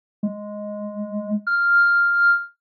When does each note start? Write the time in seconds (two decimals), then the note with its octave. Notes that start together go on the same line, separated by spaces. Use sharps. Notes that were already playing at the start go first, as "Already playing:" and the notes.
0.23 G#3
1.47 F6